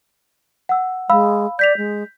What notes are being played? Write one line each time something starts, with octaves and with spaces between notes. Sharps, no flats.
F#5 E6
G#3 F5 B5 E6
D5 G6 B6 F7
G#3